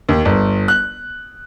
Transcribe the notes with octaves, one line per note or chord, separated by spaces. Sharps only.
D#2
G1
F#6